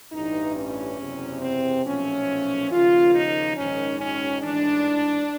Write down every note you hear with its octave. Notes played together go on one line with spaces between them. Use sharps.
A1 G2 E3 D#4
C#4
F#1 E2 C3
C4
B1 A#2 F3 A3 C#4
D#2 C#3 F3 A#3 F4
D#4
A#1 G#2 D#3 C#4
C#4
A1 G#2 E3 G#3 D4